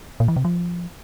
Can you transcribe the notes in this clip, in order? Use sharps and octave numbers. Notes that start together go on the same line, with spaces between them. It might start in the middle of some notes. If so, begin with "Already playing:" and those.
A#2
E3
C3
F3